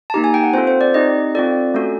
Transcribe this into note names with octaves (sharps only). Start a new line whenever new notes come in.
A5
A#3 D#4 G4 A#5
G#5
G5
F#5
C4 F4 A4 C5
C5
D5
C4 D#4 G4 D#5
C4 F4 A4 D5
A3 C#4 F#4 A4